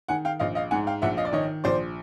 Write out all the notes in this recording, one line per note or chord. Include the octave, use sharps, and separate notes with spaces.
D#3 F#5 G#5
F5 G5
A#1 D#5 F5
D#5 F5
G#2 F#5 G#5
F5 G5
A#1 E5 F#5
D#5 F5
D5
D#3 C#5 D#5
A#1 C5 D5